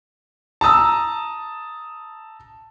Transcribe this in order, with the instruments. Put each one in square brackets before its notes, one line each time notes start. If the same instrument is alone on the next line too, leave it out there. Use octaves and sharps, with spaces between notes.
[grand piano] A5 A#5 D#6 E6